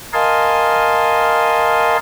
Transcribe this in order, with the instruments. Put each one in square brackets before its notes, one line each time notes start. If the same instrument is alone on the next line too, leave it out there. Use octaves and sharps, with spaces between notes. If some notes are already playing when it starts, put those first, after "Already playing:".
[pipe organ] A#4 D#5 F5 G#5 A5 C6